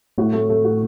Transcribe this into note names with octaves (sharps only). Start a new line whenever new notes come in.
A2 F#4
A3
A3
F#4